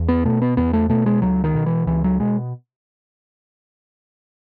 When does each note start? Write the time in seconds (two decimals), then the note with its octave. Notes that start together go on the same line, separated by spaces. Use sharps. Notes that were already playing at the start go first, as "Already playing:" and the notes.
Already playing: E2
0.08 B3
0.25 B2 A3
0.42 B3
0.57 E2 B3
0.73 A3
0.89 B2 A3
1.06 G#3
1.22 C#2 F#3
1.44 D#3
1.54 B2
1.66 E3
1.87 C#2 E3
2.04 F#3
2.19 B2 G#3